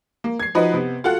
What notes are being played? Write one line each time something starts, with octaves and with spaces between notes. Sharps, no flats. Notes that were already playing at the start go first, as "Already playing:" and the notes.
A#3
G#6 C7
F3 D#4 F#4 B4 D#5
C3 B3
F4 F#4 A4 F#5